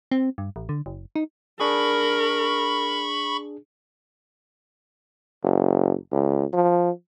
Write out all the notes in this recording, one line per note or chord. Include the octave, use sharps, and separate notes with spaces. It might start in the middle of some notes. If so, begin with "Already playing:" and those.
C4
G2
A1
D3
F#1
D#4
D4 G#4 A#4 B5 C#6
F#1
C#2
F3